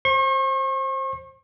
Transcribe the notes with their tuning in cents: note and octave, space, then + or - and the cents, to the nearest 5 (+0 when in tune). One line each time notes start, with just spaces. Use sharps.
C5 +20 C#6 -40